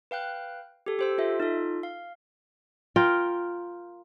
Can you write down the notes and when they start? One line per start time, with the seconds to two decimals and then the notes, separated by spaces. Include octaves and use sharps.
0.11 B4 F5 G5 F#6
0.86 G4 A4
0.99 G4 C5 E6
1.18 F4 A4 E5
1.40 D#4 F4 A4
1.83 F5
2.96 F4 A#4 G5